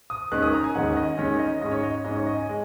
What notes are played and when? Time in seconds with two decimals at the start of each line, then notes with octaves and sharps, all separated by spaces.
0.10 D#6
0.32 D#2 D#3 G#3 C#4 F#6
0.43 D#6
0.53 A#5
0.64 G#5
0.75 D#2 D#3 G#3 C#4 F#5
0.97 D#5
1.17 D#2 D#3 G#3 C#4 C#5
1.39 D#5
1.61 G#2 G#3 C#4 D#5
1.72 C#5
1.83 D#5
2.05 G#2 G#3 C#4 D#5
2.16 C#5
2.27 D#5
2.37 G#5
2.49 G#3